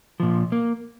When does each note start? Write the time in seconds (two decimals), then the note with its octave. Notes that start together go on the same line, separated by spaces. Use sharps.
0.20 A#2 F3
0.52 A#3